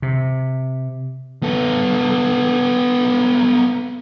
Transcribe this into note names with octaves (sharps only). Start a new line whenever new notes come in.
C3
B3 A4